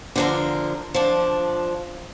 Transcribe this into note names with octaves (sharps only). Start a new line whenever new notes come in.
D3 F3 A#4
F3 D4